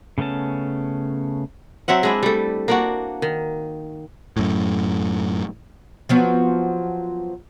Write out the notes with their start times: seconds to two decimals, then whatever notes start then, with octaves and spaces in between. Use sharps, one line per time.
0.18 C#3 A3 B3 C#4 A5
1.88 F#3 C4 E5 F#5
2.03 G#3 D4 E4
2.23 G3 A3
2.68 A#3 D4 F#4
3.22 D#3
4.37 F#2 A2
6.09 F3 F#3 B3